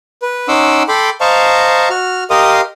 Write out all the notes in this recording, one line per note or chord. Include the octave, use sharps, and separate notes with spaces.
B4
C#4 D#4 F#5 C6 D6 E6
A4 G5 B5 C6 D6
C5 D#5 F5 A5 A#5 C#6
F#4 F6
G4 A#4 D#5 F5 C6 D#6